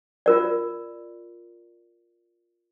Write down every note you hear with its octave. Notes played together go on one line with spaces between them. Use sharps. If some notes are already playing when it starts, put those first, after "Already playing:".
F4 A#4 D5